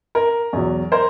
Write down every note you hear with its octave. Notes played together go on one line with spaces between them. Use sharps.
A#4
E2 B2 F#3
A#4 C5